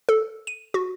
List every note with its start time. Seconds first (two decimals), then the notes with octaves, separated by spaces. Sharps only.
0.09 A4
0.47 D#7
0.74 F#4